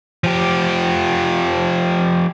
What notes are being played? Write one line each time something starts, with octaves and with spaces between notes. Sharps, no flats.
F3 G4